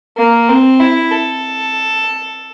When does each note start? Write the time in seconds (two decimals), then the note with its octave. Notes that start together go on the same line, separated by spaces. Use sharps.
0.17 A#3
0.48 C4
0.80 E4
1.12 A4